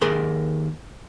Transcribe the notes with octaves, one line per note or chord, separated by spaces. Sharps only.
D#2 G#4 A#4 D5 C6